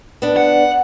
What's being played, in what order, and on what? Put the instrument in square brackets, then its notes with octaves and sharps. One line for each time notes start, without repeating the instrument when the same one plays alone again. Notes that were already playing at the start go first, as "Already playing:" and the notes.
[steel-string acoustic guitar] B3 D4
[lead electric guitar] F#5